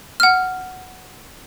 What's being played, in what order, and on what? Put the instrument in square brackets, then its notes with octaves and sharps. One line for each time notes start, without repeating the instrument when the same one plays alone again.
[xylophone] F#5 F6